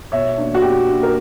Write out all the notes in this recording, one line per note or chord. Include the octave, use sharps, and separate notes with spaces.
B2 C#5 E5
A#3 D4
F#4
B2 G4
A#3 D4
A#4